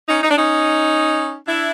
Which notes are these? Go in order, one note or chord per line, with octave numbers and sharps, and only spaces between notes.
C#4 D#4
D#4
D4
C#4 D#4
D4 E4